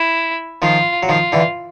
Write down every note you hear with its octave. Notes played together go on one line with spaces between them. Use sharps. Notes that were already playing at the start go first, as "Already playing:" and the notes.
Already playing: E4
D#3 F3 F4
F#3
D#3 F3 F4
D3 E3